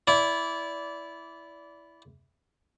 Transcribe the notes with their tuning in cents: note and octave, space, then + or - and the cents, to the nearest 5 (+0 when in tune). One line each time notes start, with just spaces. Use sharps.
E4 +0 D5 -25